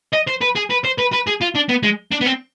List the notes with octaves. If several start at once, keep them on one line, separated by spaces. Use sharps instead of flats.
D#5
C5
B4
G#4
B4
C5
B4
B4
G#4
F4
D4
B3
G#3
D4
B3
C4